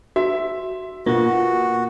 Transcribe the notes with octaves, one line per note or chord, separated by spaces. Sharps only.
F#4 E5
B2 A#3 F4 F#4